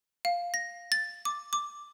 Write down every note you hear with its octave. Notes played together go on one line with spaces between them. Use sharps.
F5
A#6
A6
D6
D6